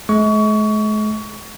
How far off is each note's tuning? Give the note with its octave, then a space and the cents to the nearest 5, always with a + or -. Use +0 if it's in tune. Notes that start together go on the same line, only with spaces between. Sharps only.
G#3 +45 C#6 +25